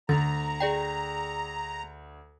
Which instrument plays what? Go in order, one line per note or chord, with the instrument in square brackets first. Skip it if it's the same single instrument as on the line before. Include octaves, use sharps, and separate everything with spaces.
[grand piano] D2 [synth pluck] D3 [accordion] A#5 [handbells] A6
[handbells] G#4 D5 G5